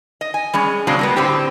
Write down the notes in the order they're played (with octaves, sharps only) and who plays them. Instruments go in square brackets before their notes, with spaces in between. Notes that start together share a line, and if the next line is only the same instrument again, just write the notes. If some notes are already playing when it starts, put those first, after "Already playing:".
[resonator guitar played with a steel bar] D#5
G#5
G3 G#3 C#4
C#3 F#3 G#3 C4 D4
G3 A#3 B3
A2 D3 C4 G4